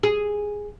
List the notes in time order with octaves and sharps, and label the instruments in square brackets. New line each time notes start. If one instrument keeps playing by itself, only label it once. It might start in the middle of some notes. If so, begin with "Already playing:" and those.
[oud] G#4